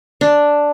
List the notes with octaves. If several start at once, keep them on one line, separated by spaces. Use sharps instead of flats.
D4